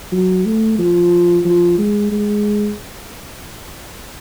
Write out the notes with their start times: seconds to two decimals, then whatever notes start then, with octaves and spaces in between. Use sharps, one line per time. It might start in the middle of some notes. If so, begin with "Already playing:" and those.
0.12 F#3
0.45 A3
0.78 F3
1.45 F3
1.78 G#3
2.11 G#3